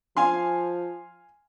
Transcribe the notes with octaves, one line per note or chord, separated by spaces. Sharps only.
F3 F5 G#5 C6